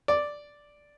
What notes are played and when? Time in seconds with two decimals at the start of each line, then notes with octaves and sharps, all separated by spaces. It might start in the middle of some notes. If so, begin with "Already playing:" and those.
0.08 D5